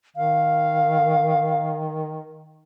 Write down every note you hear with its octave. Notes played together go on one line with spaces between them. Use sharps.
D#3 F5